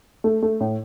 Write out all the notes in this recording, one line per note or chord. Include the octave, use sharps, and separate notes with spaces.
A3
A3
A2